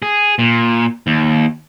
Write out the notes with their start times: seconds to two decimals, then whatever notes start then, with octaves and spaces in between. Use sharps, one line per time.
0.02 G#4
0.39 A#2
1.07 D#2